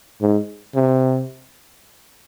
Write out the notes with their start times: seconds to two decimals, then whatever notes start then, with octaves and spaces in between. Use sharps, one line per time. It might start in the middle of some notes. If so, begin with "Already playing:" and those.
0.21 G#2
0.75 C3